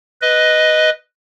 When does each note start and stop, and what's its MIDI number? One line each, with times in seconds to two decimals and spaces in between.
0.22 0.90 71
0.22 0.90 75